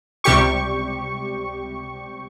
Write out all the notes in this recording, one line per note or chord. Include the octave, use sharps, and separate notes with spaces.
C#2 C3 G3 G4 C#6